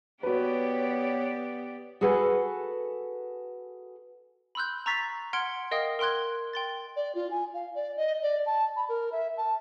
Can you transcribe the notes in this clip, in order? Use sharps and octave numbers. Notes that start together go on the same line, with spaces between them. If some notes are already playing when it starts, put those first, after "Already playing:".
B3 F#4 G4 B4 C#5 D5
F#4 G#4 A4 B4 F#5 G#5
B5 C6 E6 F#6 G6
A#5 C#6 E6 A6 B6 C7
F#5 C6 F6 G#6 C#7 D7
A#4 D#5 F5 G5 D#6
A#4 G5 C6 F#6 G#6
G5 C6 A6
D5
F4
G#5
F5
D5
D#5
D5
A5
B5
A#4
E5
A5